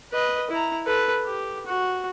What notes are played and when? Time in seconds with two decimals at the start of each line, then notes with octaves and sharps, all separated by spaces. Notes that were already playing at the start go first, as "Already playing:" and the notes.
0.12 B4 D#5
0.50 E4 A#5
0.86 A4 B4
1.26 G4
1.66 F#4